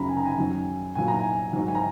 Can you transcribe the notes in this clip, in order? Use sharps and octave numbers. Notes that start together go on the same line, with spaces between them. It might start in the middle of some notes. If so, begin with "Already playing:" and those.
Already playing: F#2 C#3 F#3 A#5 B5
G#5
A#5
G#5
F#2 D#3 F#3
A#2 F#3 G#5
A#5
G#5
G#2 D#3 F#3
G#5
A#5